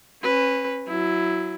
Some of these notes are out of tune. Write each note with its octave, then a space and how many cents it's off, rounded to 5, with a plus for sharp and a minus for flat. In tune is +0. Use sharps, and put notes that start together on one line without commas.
C#4 -30 B4 +5
F#3 +0 E4 +5